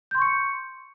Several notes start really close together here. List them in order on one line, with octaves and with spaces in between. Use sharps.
G6 C6 C#6 C#7